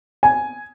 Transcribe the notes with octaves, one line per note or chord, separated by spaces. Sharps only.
G#5